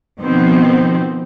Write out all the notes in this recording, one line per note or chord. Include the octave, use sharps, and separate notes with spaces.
B2 D#3 F3 B3 C4